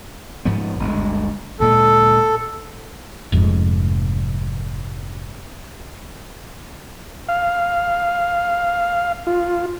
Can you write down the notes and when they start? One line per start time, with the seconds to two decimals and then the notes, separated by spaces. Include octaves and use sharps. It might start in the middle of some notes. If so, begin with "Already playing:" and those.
0.45 G#2 F3 B3
0.79 G1 D2 G#3
1.60 D2 A#2 G#3 A4
3.32 F1 F2 G#2
7.29 F5
9.27 F4